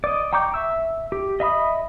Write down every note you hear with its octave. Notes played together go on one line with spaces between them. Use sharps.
D5 D#5
G5 A#5 C#6 D6 G6
E5 E6
G4
D#5 E5 B5 D#6